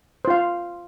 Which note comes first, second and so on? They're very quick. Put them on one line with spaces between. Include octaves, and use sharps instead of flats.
C5 F4 F5